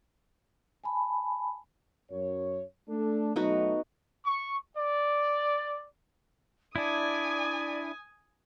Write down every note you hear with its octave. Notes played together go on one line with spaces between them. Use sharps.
G#5 A5 B5
F#2 C#5
A3 D4 A4
B1 F#3 A3 B3 D#4 F#4
C#6
D5
D4 E4 D5 G#5 D#6